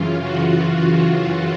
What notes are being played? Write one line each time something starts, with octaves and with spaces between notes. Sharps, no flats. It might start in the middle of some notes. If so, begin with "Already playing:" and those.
Already playing: F#2 C#3 E3 F4
F#4